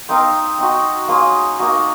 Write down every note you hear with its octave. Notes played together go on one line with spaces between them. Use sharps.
C4 D#4 A#4 F5
C4 D#4 F#4
A#3 C#4 F4 G#4
A#3 D#4 F#4